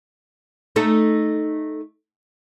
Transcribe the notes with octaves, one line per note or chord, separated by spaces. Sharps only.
A3 D#4 A4